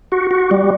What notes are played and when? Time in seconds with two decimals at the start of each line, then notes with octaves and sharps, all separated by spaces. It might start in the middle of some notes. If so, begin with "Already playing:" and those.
0.12 F#4
0.31 F#4
0.51 G3